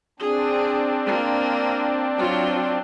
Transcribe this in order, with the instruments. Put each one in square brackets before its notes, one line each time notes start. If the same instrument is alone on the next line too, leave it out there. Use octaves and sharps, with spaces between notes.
[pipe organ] C4 D4 [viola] G#4
[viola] A#3 F4
F#3 F4